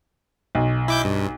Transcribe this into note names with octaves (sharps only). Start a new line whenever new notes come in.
B1
E4 D6 G6
G2